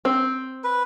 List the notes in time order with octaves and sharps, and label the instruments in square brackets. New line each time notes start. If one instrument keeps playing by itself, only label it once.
[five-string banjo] C4
[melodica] B4